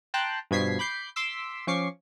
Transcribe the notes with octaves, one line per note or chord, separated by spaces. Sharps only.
G5 A5 A#5 C6 F#6
G2 B2 F3 G#6 B6 C7
B5 D6 G6 C7
C6 D6 E6 B6
F3 C#4 C#6 D6 C7